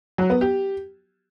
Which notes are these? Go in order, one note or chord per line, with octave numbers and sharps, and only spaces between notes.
F#3
B3
G4